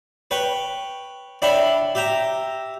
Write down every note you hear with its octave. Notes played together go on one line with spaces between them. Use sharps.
B4 C#5 G5
D4 E4 C#5 G5 B5
G4 E5 G5 A#5